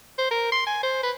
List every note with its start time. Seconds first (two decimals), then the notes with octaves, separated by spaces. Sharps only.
0.18 C5
0.31 A#4
0.52 C6
0.67 G#5
0.83 C5
1.03 B4